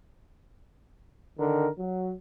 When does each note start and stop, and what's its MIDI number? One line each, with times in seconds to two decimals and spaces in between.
1.39 1.69 50
1.39 1.69 51
1.39 1.69 70
1.79 2.12 54